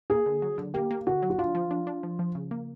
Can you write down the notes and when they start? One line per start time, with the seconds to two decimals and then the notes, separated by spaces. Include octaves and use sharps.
0.10 A#3 G#4
0.26 D3
0.42 F#3
0.58 D3
0.74 A#3 G4
0.91 A#3
1.07 D3 F#4
1.22 F#3
1.30 F#4
1.38 D4 F4
1.55 F3
1.71 D4
1.87 D4
2.03 F3
2.19 F3
2.35 C#3
2.51 A#3